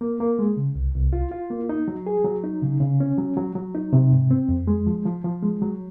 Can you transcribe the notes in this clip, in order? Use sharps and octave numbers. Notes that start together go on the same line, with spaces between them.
A#3
A#3
G#3
C#3
C2
C2
F4
F4
A#3
D#4
F#3
G#4
F#3
D#4
C#3
C#3
C#4
F#3
F#3
F#3
D#4
C3
G#2
C4
F2
G#3
F3
F3
F3
G#3
F#3